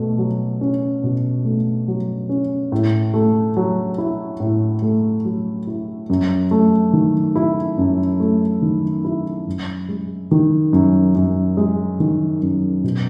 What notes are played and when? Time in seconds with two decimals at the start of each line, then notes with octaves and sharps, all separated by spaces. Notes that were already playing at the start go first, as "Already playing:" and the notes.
Already playing: B2 A3
0.18 F#3
0.61 C#4
1.03 B2
1.45 A3
1.88 F#3
2.29 C#4
2.72 A2
3.14 A3
3.57 F#3
3.98 E4
4.40 A2
4.82 A3
5.25 F#3
5.67 E4
6.10 F#2
6.51 A3
6.93 D#3
7.35 E4
7.78 F#2
8.20 A3
8.62 D#3
9.05 E4
9.47 F#2
9.89 G#3
10.31 D#3
10.73 F#2
11.15 F#2
11.57 G#3
12.00 D#3
12.42 F#2
12.84 B2